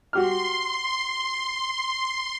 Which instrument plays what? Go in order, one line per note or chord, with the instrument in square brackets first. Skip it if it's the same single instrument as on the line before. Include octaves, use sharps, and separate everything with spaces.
[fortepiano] F#4 G4 F6 [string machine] C6